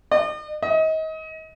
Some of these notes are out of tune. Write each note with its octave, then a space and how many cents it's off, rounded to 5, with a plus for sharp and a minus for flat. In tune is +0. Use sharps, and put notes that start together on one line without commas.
D#5 -45
D#5 +30